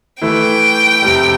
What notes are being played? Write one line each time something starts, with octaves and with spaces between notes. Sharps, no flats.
E3 A3 E4 B4 G5
F2 C3 G3